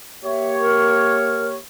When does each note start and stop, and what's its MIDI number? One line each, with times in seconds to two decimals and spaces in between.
0.24 1.58 58
0.24 1.58 67
0.24 1.58 73
0.24 0.49 76
0.60 1.47 70